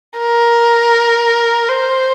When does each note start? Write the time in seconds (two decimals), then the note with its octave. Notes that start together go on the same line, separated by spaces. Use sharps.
0.18 A#4
1.69 C5